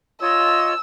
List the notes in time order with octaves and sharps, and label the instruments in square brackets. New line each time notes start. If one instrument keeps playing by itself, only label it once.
[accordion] F4 C#5 D#5 [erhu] E6